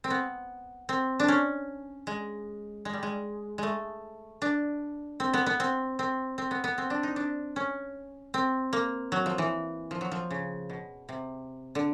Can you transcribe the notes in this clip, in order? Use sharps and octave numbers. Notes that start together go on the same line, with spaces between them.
C4
B3
C4
D4
C#4
G#3
G#3
G3
G#3
G#3 A3
D4
C4
B3
B3
C4
C4
C4
B3
B3
C4
D4
D#4
D4
C#4
C4
A#3
F#3
F3
E3
F3
F#3
F3
C#3
B2
C3
D3